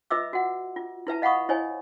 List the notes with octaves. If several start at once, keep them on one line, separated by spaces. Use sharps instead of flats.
F4 B4 D#5 E5 D6 E6
F#4 F#5
F4
E4 B4 E5 A5
D#5 F5 F#5 B5 C#6 D#6
E4 C5 C#5 D#5 G#5